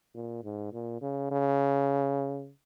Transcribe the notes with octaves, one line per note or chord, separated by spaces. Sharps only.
A#2
G#2
A#2
C#3
C#3